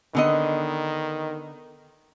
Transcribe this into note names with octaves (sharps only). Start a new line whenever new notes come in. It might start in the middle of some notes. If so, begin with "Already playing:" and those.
D3 D#3 B3 D#5